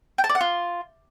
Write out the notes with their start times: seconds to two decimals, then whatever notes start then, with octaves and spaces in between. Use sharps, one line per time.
0.18 G5
0.24 A5
0.29 D5
0.35 F#5
0.41 F4